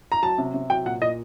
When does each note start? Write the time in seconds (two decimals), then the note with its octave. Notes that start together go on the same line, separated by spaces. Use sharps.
0.12 A#5
0.22 F#3 A5
0.38 C3
0.54 C3
0.70 F#3 G5
0.86 A#2 F#5
1.02 A#2 D#5